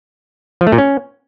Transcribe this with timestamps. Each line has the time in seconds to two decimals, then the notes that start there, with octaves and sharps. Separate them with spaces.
0.61 F3
0.67 A3
0.72 A#2
0.78 C#4